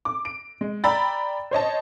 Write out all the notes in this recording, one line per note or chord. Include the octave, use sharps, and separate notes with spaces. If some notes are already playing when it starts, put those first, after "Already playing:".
D6
D7
G#3
D5 G5 A#5 B5 E6 A6
C5 C#5 D#5 A5